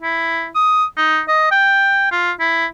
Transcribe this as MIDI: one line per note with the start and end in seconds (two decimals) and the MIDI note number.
0.02 0.48 64
0.55 0.84 87
0.97 1.21 63
1.28 1.51 75
1.51 2.09 79
2.12 2.32 65
2.40 2.66 64